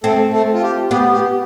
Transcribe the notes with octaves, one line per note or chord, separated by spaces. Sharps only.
A3 C4 A4
A3 A4
F4
G4
B3 G4
G4